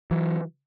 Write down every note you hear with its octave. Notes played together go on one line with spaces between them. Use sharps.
E3 F#3